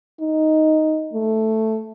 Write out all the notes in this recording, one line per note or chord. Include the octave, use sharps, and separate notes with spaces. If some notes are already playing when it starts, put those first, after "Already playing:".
D#4
A3